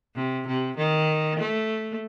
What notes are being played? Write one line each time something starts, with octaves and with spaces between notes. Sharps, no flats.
C3
C3
D#3
A3